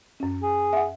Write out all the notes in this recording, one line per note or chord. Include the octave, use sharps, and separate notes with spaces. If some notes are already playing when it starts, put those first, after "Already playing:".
F#2 C#4
G#4
E5 F#5